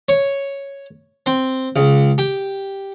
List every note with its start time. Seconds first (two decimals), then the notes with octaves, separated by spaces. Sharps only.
0.09 C#5
1.26 C4
1.76 C#2
2.18 G4